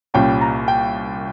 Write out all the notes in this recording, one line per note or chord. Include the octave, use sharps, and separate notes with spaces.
C2 A#2 G3 C#4 G5
A#5
G5